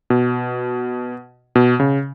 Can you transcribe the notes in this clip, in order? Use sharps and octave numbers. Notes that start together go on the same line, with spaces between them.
B2
B2
C#3